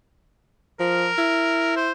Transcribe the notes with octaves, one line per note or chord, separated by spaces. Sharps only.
F3 A#4
E4
C5